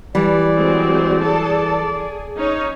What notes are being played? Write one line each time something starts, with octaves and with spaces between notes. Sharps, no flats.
E3 G3 D5
F#3 G#3 C4
G#4 A4 A5
G#4
C#4 D#4 C#5